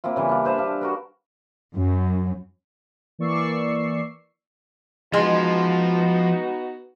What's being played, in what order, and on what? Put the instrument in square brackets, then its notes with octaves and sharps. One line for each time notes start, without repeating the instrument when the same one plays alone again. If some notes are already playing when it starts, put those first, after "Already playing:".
[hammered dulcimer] A#3 C4 E4 F4
C#3 E3 G3
D4 F5
B4 C5 E5 A5
D4 F5
F#4 A#4 B4
[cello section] F#2
[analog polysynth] E3 A#3 D5 C#6 E6 C7
[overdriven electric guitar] F3 C6 [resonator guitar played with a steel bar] G#3 [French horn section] B3 D#4 F#4